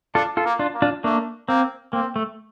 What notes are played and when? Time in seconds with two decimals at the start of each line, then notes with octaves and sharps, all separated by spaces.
0.15 D4 F4 A4
0.37 F4 A4
0.45 A#3
0.59 D4 F4
0.74 A#3
0.82 D4 F4
1.04 A3 A#3 D4
1.48 A#3 C4
1.93 A#3 C4
2.16 A3